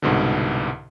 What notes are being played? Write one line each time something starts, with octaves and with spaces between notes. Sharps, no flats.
C2 G#2 B2 D3